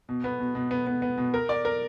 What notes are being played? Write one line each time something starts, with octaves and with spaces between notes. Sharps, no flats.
B2
B3
B2
B2
B3
B3
B3
B2
A#4
D5
A#4